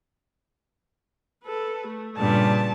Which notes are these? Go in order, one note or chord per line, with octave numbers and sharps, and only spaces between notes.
A4 B4
A3
G2 A#2 C#3 A5